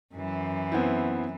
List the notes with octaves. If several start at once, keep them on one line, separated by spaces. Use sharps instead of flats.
F#2 E3
B3 C4 E4